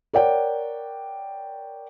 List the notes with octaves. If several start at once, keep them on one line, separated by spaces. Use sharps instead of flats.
A#4 C#5 D5 F#5 G5